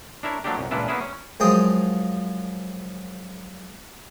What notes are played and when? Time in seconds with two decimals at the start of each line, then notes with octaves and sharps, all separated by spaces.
0.23 D4 E4 A#4 C#5
0.44 F3 F#3 A3 A#3 D4 G4
0.58 C2 F#2
0.71 C#2 A#2 E3 D4 E4 F4
0.88 A#3 B3 C#4 E4 G#4
1.01 C#4
1.40 F#2 F3 G#3 G5 D#6